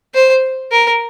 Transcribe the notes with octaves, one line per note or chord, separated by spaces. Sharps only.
C5
A#4